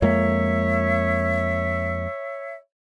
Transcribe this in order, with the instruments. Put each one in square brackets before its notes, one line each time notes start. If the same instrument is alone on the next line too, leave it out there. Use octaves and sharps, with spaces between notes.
[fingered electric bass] F2 G#3 A#3 [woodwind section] C#5 E5